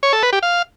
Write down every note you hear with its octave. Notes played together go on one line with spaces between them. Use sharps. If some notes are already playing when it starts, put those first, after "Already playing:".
C#5
A4
B4
G4
F5